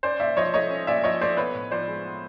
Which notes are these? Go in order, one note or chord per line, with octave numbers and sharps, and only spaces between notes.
C#4 C5 D5
A#2 D5 E5
F3 C#5 D#5
A3 C#5 D#5
C#4
A#2 D5 E5
F3 C#5 D#5
A3 C5 D5
B3 B4 C#5
A2
F3 C5 D5
G#3
B3